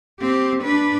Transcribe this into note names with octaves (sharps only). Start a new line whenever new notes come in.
C4 G4
D4 B4